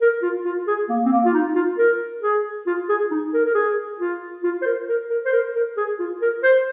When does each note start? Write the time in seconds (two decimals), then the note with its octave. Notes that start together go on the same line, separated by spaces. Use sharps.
0.01 A#4
0.23 F4
0.45 F4
0.67 G#4
0.89 A#3
1.06 C4
1.12 A#3
1.25 F4
1.34 D#4
1.55 F4
1.78 A#4
2.22 G#4
2.67 F4
2.89 G#4
3.11 D#4
3.34 A#4
3.45 A#4
3.55 G#4
4.00 F4
4.44 F4
4.62 C5
4.66 A#4
4.89 A#4
5.10 A#4
5.26 C5
5.33 A#4
5.56 A#4
5.77 G#4
5.99 F4
6.22 A#4
6.43 C5